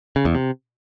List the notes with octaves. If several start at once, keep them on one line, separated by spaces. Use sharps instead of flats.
C#3
E2
C3